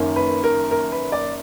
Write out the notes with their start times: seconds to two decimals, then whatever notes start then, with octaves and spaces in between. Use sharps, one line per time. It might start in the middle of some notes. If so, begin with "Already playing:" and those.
Already playing: F#1 F#2 D#3 A#3
0.16 B4
0.44 A#4
0.71 A#4
0.92 B4
1.12 D5